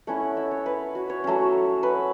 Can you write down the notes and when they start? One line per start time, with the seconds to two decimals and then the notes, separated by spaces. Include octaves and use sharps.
0.07 A3 C#4 E4 F#5
0.37 E5
0.51 C#5
0.66 B4
0.95 F#4
1.10 C#5
1.24 F#3 A3 C#4
1.83 B4